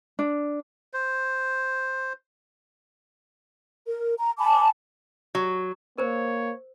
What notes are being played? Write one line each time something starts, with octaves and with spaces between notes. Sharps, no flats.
D4
C5
A#4
A#5
G#5 A5 B5 D6
F#3
A#3 A#4 C5 C#5